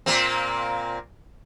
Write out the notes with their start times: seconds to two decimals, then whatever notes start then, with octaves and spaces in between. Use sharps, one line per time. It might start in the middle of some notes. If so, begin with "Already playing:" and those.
0.06 A#2 A#3 C4